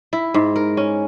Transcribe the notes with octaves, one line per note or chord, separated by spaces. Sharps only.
E4
G#2
A#4
C#4